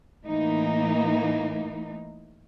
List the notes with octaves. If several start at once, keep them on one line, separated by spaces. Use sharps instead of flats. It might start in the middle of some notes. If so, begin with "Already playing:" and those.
A2 E3 A#3 D#4